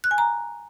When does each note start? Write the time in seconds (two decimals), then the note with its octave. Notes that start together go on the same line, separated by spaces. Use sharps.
0.04 F#6
0.11 G#5
0.18 A#5